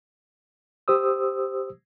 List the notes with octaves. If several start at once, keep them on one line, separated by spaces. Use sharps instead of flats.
G4 C5 D#6 E6